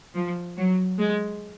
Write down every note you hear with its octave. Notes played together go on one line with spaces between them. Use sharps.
F3
F#3
G#3